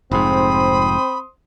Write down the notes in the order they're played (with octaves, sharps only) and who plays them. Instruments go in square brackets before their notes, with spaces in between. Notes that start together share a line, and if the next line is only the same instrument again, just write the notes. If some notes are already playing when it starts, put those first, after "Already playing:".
[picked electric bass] F1 G#2 [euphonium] C4 [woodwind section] C5 C6 D#6 [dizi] B5